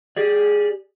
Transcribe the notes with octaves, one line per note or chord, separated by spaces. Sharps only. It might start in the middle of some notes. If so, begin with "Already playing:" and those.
G4 G#4 D5